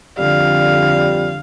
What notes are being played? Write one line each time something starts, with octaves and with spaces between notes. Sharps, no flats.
F2 D3 G3 F5